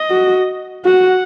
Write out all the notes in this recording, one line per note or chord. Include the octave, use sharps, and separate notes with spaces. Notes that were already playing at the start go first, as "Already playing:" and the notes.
Already playing: D#5
F#4
F#4 F#5